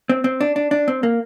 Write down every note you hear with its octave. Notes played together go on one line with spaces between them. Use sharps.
C4
C4
D4
D4
D4
C4
A#3